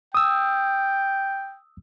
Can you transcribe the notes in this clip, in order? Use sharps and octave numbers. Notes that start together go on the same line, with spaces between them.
G5 D#6 E6